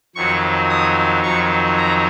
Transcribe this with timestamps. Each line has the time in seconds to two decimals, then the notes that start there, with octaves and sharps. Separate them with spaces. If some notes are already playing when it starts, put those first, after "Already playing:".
0.15 F2 D#3 F#3 C#6
0.70 D#6
1.23 F2 D#3 F#3 C#6
1.78 A#5